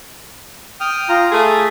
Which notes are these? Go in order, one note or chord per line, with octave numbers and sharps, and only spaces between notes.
G5 D#6 F6
F4 A#5
A3 G#4 G#5